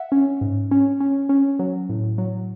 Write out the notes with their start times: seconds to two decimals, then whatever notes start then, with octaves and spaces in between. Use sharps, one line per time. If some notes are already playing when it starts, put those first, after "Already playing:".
Already playing: E5 F#5
0.12 C#4
0.41 G#2
0.71 C#4
1.00 C#4
1.29 C#4
1.59 F#3
1.89 A2
2.18 F#3